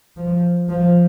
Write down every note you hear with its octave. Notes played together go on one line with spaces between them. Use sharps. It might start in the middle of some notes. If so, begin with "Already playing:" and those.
F3
F3